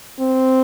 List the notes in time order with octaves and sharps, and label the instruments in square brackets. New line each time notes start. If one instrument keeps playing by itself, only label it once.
[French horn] C4